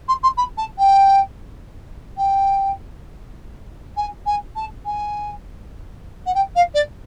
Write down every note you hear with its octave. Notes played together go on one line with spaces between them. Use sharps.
C6
C6
B5
A5
G5
G5
G#5
G#5
A5
G#5
F#5
G5
F5
D5